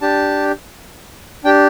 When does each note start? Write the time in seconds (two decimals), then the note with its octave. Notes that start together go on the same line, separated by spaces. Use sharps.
0.01 D4 G4 A5
1.44 D4 G4 G5